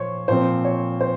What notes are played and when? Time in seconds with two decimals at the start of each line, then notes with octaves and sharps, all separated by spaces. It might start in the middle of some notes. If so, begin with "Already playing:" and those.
Already playing: A#2 F3 C5 C#5
0.28 A#2 F3 C4 C5
0.65 C#5
1.01 C5